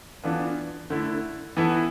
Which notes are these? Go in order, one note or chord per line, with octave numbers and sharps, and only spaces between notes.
E3 B3 D4 F4 A4
D3 A3 E4
E3 B3 E4 A4